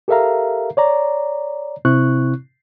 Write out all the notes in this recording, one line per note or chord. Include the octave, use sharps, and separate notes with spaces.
G4 A4 A#4 E5 F5 A#5
C#5 D5 A#5
C3 C4 E4 C#6 F#6